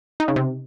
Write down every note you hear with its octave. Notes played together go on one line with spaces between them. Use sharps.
D#4
C#3
C3